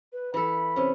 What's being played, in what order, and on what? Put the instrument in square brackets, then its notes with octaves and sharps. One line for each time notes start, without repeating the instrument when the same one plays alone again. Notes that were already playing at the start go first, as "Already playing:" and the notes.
[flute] B4
[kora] E3 A4 [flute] B5
[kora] C3 C#4